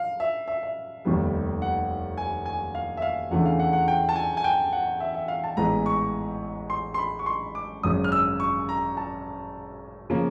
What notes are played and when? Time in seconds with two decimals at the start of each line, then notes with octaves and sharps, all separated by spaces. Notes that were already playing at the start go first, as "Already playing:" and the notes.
Already playing: F5
0.20 E5
0.48 E5
0.63 E5
1.05 F1 D#2 D#3 G3 B3
1.62 F#5
2.17 G#5
2.46 G#5
2.75 F5
2.97 E5
3.02 F5
3.31 E2 C#3 E3 A3 D4 F#5
3.46 F5
3.59 F#5
3.73 F#5
3.88 G5
4.09 A5
4.16 G#5
4.37 G#5
4.44 G5
4.73 F#5
5.00 E5
5.15 E5
5.28 F5
5.44 A5
5.57 A1 G#2 E3 G#3 B3 A#5
5.86 C#6
6.70 C6
6.94 C6
6.98 B5
7.19 C#6
7.26 C6
7.55 D6
7.83 G#1 F#2 C#3 D#6
8.04 F6
8.12 E6
8.40 C#6
8.69 A#5
8.97 A5
10.10 C#3 F3 A#3